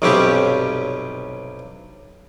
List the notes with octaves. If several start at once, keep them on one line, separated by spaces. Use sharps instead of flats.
B1 G2 C3 G3 C#4 G4